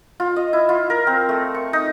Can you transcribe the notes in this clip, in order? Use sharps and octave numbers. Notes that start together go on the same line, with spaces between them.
F4
D#5
E4
F4
A#4
C4
A3
C#6
D#4